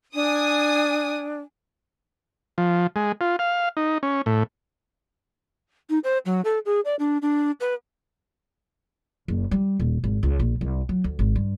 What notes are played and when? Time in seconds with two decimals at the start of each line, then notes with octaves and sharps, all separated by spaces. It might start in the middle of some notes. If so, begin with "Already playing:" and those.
0.15 D4 G#5 D#6
2.58 F3
2.96 G#3
3.21 F4
3.39 F5
3.77 D#4
4.03 C#4
4.26 A2
5.90 D#4
6.04 C5
6.26 F#3
6.45 A4
6.66 G#4
6.85 D5
6.99 D4
7.22 D4
7.60 B4
9.28 F#1
9.51 G3
9.79 D#1
10.04 G#1
10.23 C#2
10.39 A#1
10.61 C2
10.89 F#3
11.04 D2
11.19 G#1
11.36 G2